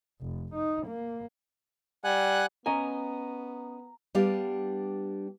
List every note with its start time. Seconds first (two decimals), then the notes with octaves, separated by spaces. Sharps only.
0.21 F1
0.55 D#4
0.87 A#3
2.04 G3 F#5 G#5 F#6
2.66 B3 C#4 D#5 G#5 A#5
4.15 G3 B3 D4 G4 F5